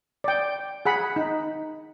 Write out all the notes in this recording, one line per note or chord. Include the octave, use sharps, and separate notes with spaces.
D5 G5
G#4 F#5 B5
D#4